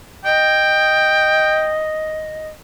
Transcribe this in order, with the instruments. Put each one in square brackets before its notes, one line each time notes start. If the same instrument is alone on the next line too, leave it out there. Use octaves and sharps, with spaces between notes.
[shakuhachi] D#5 [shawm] G5